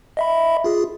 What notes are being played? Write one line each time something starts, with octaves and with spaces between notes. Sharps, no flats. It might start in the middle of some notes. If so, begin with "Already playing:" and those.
D#5 E5 B5
F4 G#4